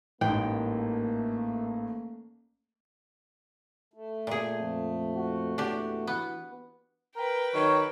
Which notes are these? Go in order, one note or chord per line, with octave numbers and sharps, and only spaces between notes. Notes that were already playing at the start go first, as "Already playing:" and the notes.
A1 G#2 A3 A#3 G5
A3
A#2 G#4
F2
F#4
E2 D4 G4
E3 B3
A#4 B4 G5
D#3 F#3 C#5